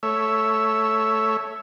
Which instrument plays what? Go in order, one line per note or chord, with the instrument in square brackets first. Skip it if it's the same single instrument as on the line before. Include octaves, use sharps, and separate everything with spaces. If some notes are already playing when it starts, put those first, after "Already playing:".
[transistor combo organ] A3 C#5 E5